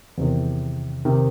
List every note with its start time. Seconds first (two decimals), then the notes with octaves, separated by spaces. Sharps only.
0.18 E2 C3 D#3
1.05 C3 D#3